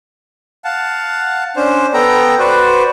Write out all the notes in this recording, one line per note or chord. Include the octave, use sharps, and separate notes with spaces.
F5 F#5 A5
C#4 D4 C5
B3 A4 G5 A#5
F#4 B4 C5 D5